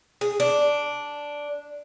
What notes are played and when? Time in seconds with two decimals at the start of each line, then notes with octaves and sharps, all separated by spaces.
0.21 G#4
0.40 D4